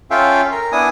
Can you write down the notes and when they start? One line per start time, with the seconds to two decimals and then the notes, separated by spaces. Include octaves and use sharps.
0.11 C#4 F4 A4 E5 F5 G5
0.52 A#4
0.72 B3 D4 E4 G#5 D#6